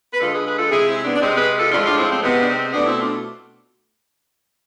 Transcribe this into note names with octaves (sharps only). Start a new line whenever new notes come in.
B4
D3 G#3 F4 A4
G#4 B4
G#4 B4
F4 A4
C3 G#3 E4 G#4
C4 E4
B3 D4
D4
C3 G#3 C4
G#4 B4
F4 A4
A2 F3 G#3 D4 F4
D4 F4
C4 E4
C4
C3 G#3 B3
D4
C4
B2 A3 B3 D4
C4 E4
D4 F4